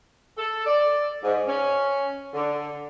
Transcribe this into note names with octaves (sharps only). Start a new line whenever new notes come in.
A4
D5
G#2
C#4
D3